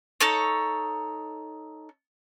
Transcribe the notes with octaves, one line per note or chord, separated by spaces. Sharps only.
D#4 A4 C#5